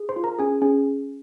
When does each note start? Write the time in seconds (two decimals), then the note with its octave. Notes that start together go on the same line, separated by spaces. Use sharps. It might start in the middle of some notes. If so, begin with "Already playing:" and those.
Already playing: G#4
0.09 C5 C6
0.16 F4
0.24 A#4 A#5
0.38 C#4 G#4 G#5
0.62 C#4 G#4 G#5